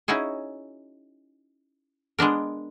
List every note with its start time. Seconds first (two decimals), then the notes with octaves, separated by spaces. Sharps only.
0.08 C#4 D#4 E4 F#4 G#4
2.19 G#3 B3 D4 A#4